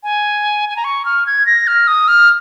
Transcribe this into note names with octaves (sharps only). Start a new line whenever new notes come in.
G#5
G#5
A#5
C#6
F6
G#6
A#6
F6
D#6
F6